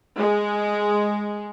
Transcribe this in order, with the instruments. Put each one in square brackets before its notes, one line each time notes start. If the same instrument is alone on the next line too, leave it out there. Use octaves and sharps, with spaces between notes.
[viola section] G#3